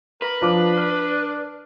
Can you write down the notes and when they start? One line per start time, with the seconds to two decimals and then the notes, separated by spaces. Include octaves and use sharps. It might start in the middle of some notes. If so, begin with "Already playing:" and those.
0.22 A#4 B4
0.42 F3 D4 D6
0.77 F6